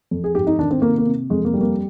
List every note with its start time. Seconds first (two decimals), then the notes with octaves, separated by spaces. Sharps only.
0.11 F2
0.24 G#4
0.35 G#2 G4
0.47 D#4
0.59 D#3 D4
0.71 C4
0.82 C3 A#3
0.98 A#3
1.06 C3
1.30 F2 G#3
1.45 A#3
1.53 G3
1.61 A#3